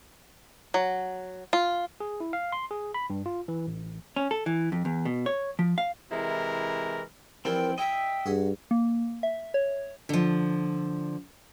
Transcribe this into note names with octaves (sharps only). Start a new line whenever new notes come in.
F#3
F4
G#4
E4
F5
C6
G#4
B5
G2
F4
E3
A1
C#4
A4
E3
F2
E2
B2
C#5
F3
F5
C3 E3 G#3 E4 A#4
E3 F3 G3 C4 E4 A#4 G5
E4 D#5 E5 G5 A#5
G2 F#4 G#4
A#3
E5
C#5
D3 F3